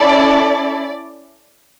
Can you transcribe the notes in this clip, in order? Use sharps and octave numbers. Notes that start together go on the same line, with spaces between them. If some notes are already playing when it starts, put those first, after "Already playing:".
Already playing: C#4 E4 A4 D5